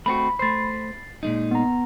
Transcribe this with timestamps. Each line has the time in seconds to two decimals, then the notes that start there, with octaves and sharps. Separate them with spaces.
0.06 A3 C4 F#4 B5
0.39 A3 C5 A6 C7
1.23 A#2 G#3 D#4
1.51 B3 A#5